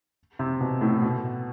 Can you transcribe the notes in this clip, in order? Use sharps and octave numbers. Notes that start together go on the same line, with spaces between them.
C3
B2
A2
B2